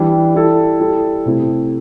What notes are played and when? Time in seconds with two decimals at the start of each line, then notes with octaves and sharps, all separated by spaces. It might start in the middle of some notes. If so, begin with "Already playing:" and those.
Already playing: E3 G3 D4 G4
0.34 G3 E4 A4
0.80 G3 E4 A4
1.26 C3 A3 E4 G4